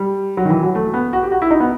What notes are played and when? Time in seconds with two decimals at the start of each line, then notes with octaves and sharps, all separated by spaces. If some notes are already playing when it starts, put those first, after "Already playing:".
Already playing: G3
0.37 F#3
0.45 D#3
0.50 E3
0.63 F#3
0.75 A3
0.94 B3
1.13 F#4
1.23 G4
1.32 F#4
1.42 E4
1.51 D#4
1.60 B3